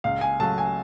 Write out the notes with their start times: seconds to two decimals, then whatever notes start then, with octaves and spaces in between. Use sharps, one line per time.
0.04 C#2 F5
0.21 G#5
0.40 C#3 F#3 A3 A5
0.58 G#5